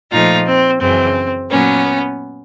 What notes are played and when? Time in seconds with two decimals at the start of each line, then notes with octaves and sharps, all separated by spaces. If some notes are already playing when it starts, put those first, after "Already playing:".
0.11 A#2 F3 A3 D#4 F4
0.46 C4
0.80 F#2 C#3 E3 C4
1.50 A#2 F#3 A#3 B3 C#4